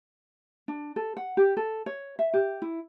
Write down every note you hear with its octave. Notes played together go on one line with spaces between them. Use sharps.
D4
A4
F#5
G4
A4
C#5
E5
G4
E4